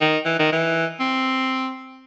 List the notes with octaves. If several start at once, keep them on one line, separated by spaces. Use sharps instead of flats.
D#3
E3
D#3
E3
C4